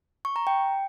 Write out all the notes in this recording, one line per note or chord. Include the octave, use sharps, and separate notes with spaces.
C#6
A#5
G5